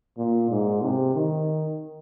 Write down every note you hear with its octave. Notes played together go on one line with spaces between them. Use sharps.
A#2
G#2
C3
D#3